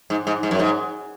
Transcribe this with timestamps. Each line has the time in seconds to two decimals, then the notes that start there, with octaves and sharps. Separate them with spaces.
0.10 G#2
0.27 G#2
0.43 G#2
0.51 F#2
0.59 G#2